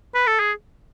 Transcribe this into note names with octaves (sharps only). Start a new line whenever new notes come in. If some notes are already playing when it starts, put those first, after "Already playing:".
B4
A4
G#4